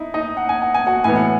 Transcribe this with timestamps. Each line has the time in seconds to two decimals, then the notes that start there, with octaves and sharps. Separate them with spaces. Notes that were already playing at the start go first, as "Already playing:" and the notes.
Already playing: D#4 E4
0.14 D#4 D#5
0.37 F#5
0.49 G#5
0.62 F#5
0.74 G#5
0.87 F#4 F#5
1.04 A2 E3 B3 G#5
1.16 F#5